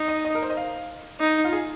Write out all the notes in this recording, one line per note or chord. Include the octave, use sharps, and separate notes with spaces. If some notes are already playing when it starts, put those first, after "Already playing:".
Already playing: D#4
D#5
D#5
A#4
C5
D#5
F5
D#4
F4
G#4